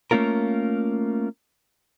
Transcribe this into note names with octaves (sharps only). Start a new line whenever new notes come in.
A3 A#3 C#4 F4 A#4